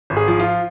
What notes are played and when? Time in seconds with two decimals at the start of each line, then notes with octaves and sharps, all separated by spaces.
0.10 G#1
0.17 G#4
0.28 F3
0.40 F4